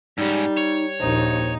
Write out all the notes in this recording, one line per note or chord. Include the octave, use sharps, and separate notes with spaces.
G#2 G3 C#4 D#4
C#5
A#1 D#2 D#4 C5